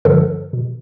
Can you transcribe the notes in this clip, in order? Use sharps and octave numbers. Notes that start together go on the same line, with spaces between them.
G2 D3 F3 A4
B2